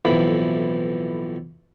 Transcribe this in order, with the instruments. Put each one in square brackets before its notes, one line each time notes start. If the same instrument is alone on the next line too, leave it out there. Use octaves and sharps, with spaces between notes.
[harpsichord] B1 F2 A2 E3 B5